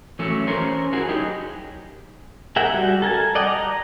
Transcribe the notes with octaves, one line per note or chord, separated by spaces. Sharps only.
E3 F#3 A3 C#4 A4
C#4 G#4 A#4 C5 C#5
E4 F#4 G#4 A#4
F#3 D#4 G4 G#4
G#4 A#4 E5 F#5 G5
G3 F#4
A4 A#4 G#5 A5
D5 D#5 F#5 G5
A#5